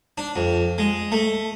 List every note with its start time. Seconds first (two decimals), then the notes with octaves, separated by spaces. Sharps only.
0.18 D4
0.36 F2
0.78 G#3
1.12 A3